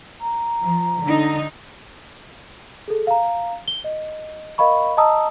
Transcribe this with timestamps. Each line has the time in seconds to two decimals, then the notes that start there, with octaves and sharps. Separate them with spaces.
0.21 A#5
0.60 F3
1.02 D3 D#4
2.88 G#4 A4
3.07 F5 A#5
3.68 G7
3.84 D#5
4.58 A#4 D#5 F5 B5 C#6
4.97 D#5 A5 A#5 D#6 E6